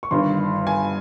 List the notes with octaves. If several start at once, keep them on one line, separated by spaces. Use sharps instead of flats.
C#6
G1 G2 D#3 C6
G#5